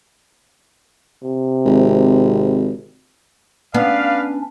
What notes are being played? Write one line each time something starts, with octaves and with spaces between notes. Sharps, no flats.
C3
G#1
B3 C#4 D4 B4 D5 F5